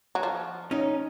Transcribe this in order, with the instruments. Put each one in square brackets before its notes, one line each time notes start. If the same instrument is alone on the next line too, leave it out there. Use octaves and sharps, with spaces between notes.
[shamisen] F#3
F3
[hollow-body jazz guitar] C#4 D#4